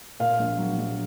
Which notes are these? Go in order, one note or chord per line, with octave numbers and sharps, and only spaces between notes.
A#2 F5
A#1
F#3
A#1